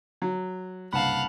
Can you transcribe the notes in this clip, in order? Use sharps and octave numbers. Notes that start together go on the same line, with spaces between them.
F#3
F#1 C2 G2 F5 F#5 A5 B5